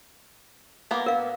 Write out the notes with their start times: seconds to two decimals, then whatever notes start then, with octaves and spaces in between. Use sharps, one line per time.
0.91 A#3 B3
1.06 A#4 F5